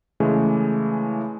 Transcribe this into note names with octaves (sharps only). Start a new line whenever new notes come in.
C#3 E3 G#3 A3